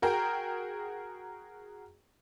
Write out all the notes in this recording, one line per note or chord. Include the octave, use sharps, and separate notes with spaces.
F#4 G#4 A#4 G5 A#5